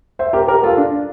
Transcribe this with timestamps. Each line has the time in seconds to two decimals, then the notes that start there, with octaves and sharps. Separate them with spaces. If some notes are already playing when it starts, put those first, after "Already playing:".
0.19 C5 E5
0.33 G4 A#4
0.48 G4 A#4
0.63 F4 A4
0.77 D4